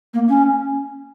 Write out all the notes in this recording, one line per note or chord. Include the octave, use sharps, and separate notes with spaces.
A#3
C#4